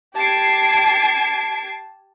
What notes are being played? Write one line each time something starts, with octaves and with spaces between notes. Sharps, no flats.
G4 A5 G#6 C7 D7